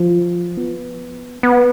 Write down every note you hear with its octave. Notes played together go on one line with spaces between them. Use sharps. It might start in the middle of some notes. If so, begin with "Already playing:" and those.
Already playing: F3
B3
B3